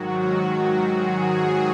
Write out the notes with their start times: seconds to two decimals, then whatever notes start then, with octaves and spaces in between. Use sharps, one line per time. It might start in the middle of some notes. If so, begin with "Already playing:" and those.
Already playing: G#2 D#3 F#3 F#4
0.80 G#4